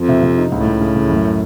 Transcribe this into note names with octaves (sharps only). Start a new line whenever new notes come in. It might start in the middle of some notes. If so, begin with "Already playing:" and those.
Already playing: F2 F3
C3
C3
D#4
C#2 A2
C#2
C#3
C#2
F#2